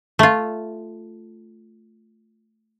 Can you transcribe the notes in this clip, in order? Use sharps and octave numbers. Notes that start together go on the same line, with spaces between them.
A3 F4